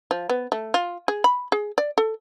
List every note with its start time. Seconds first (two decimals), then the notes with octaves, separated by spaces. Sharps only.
0.11 F3
0.30 B3
0.52 A3
0.74 F4
1.08 G#4
1.24 B5
1.52 G#4
1.78 D5
1.98 A4